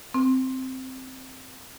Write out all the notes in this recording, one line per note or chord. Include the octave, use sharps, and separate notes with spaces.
C4